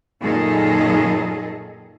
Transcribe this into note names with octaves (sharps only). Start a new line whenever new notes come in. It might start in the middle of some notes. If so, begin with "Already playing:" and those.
F#2 A#2 D#3 G#4 A4 D#5